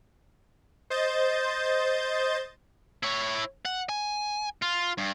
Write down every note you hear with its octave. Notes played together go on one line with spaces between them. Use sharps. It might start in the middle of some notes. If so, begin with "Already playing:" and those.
C5 D#5 G6 A6
E4 C#5
F#5
G#5
F4
G2